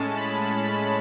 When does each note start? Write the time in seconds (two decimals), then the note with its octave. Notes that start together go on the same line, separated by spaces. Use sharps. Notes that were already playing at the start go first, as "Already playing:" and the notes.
Already playing: A2 G#3 C#4 A5
0.17 B5
0.64 B5